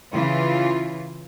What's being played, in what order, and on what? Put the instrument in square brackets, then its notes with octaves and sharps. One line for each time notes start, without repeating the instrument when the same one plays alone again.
[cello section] C#3 E3 F4